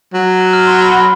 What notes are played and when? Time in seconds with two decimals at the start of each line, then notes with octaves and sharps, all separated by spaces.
0.14 F#3
0.40 F#6
0.53 F6
0.67 C6
0.81 B5
0.89 C6
0.94 B5